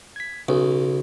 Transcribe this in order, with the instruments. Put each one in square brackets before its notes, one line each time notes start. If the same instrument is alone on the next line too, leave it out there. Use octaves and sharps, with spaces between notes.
[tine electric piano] G#6 B6
[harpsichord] B1 [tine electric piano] C#3